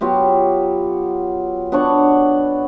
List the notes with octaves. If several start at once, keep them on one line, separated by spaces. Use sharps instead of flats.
F#3 B3 F4 G4
B3 D4 C#5 F#5